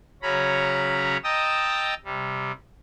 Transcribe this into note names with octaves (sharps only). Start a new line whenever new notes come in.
C#3 F#3 C#4 C#5 A#5 B5
D#5 G5 A5 A#5 D#6 E6
C3 G3